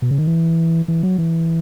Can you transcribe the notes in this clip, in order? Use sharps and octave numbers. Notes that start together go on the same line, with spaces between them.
B2
C#3
D#3
E3
E3
F#3
E3